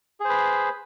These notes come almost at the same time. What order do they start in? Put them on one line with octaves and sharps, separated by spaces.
G#4 C5 B4